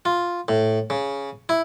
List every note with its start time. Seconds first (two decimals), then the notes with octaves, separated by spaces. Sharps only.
0.05 F4
0.48 A2
0.90 C#3
1.49 E4